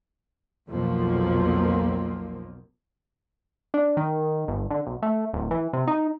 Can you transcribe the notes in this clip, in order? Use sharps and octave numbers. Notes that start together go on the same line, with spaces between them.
B1 F2 B2 F3 A#3
D4
D#3
G1
D3
B1
A3
D1
E3
C3
D#4